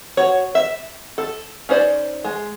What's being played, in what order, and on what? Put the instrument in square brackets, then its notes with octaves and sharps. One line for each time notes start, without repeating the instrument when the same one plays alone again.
[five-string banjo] F#4 C#5
E5
A4
C#4 D#4 C5 D5
G#3